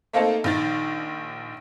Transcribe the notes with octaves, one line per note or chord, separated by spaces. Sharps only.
A3 A#3 C4 D#4 A4
A#1 D#3 A6